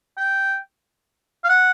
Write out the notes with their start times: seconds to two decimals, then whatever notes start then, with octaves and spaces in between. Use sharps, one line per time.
0.17 G5
1.44 F5
1.49 F#5